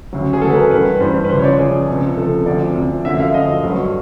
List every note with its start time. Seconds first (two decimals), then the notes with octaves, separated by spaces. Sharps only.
0.13 D2 C#3 F#3
0.33 G#4
0.41 D2 C#3 F#3 A4
0.50 B4
0.56 A#4
0.71 G2 E3 G3 B4
1.00 G2 E3 G3 C5
1.25 B4
1.30 C#2 C#3 F3 C5
1.39 C#5
1.44 D5
1.58 C#2 C#3 F3 G#4
1.88 C#2 C3 F3
2.17 C#2 C3 F3 A4
2.46 D2 C3 F3 D5
2.76 D2 C3 F3
3.05 F#2 D3 F3 E5
3.20 F5
3.33 F#2 D3 F3 D#5
3.64 G2 D3 F#3